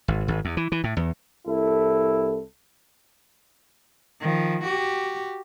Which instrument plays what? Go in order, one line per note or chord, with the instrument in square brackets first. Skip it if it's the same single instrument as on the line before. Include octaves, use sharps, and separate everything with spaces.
[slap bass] G#1
G#1
E2
E3
E3
A2
E2
[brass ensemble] C2 E4 A4
[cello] D#3 F3
F#4 G4